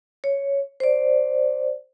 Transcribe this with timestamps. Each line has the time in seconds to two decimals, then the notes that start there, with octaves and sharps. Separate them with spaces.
0.24 C#5
0.80 C5 D5